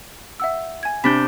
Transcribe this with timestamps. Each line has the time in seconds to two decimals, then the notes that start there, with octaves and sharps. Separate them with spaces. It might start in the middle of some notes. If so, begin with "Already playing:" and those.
0.40 E5 F#5 E6
0.83 G#5 G#6
1.04 C3 D4 B5 G6 B6